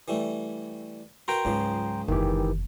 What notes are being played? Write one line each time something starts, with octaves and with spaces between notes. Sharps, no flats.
E3 G3 A3
F#4 A#4 B4 G5 A#5 C6
C#2 G#2 C#3 F3 F#3
F#1 E2 D#3 E3 G4